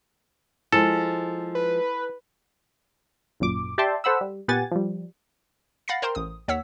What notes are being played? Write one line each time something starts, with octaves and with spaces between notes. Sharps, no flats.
F3 G#3 E4 A4
B4
G#1 F#2 A#2 D6
G4 D5 E5 G5 A5 C6
A4 C5 F#5 B5 E6
G3
A#2 B3 G4 F#5 G#5 A6
F3 G3
F5 F#5 B5 A6 A#6 C7
A#4 C5 G5 A#5 C6
A1 D#6
D#2 C#5 F#5 E6 B6